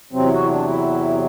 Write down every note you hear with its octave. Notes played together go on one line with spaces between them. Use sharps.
E2 C3 F#3 C4
E4
F#4
E4
D4
E4